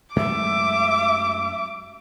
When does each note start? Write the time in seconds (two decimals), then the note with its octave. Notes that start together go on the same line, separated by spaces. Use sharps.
0.16 F#2 G#3 A3 E5 D6